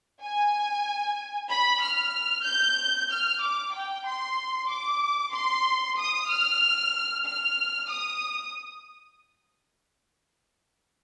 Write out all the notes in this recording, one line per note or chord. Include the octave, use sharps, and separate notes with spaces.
G#5
B5
F6
G6
F6
D6
G5
C6
D6
C6
D#6
F6
F6
D#6